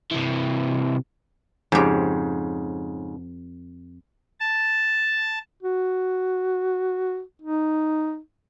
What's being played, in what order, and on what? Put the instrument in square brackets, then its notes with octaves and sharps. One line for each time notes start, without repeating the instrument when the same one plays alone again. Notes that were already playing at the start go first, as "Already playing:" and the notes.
[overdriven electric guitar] C3 E3
[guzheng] F2 G4 [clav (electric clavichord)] G#2 C#3
[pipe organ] A5
[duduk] F#4
D#4